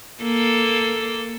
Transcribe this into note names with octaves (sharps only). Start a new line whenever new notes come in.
A#3 A4